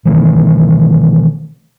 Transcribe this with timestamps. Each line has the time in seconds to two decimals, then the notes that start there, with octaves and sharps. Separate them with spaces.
0.05 B2 D#3 E3 A3